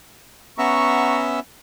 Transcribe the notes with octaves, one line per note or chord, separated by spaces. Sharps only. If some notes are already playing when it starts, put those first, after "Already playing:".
B3 C#4 E5 F#5 A#5 C#6